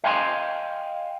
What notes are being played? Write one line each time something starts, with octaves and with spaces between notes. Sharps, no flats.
D#5 F5 G5 G#5 B5 C6